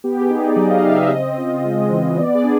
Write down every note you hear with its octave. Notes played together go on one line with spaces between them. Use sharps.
B3 G4
G#4
D#4
D5
F#3 D#5
F5
C#3 E5
D#5
C4
F4
G#3
E3
B3 D5
G#4
D4